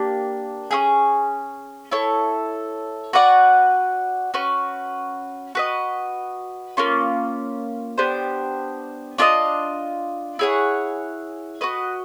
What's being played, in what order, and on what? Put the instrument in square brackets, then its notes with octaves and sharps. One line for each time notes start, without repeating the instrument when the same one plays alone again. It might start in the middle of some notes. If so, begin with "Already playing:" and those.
Already playing: [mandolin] A#3 D4 G4
C#4 E4 G#4
E4 A4 C#5
F#4 B4 D5 F#5
C#4 F#4 B4
F#4 B4 D#5
A#3 C#4 F4
B3 D4 G4 C5
D4 F4 A#4 D#5
E4 G#4 C#5 F#5
F#4 B4 D#5